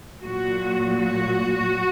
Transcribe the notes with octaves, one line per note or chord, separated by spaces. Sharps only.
A#2 F#3 F#4
F#4